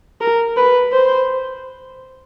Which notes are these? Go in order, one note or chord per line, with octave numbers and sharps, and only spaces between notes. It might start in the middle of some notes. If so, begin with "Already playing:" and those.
A#4
B4
C5